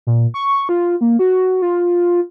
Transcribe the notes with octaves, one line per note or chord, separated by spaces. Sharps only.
A#2
C#6
F4
A#3
F#4
F4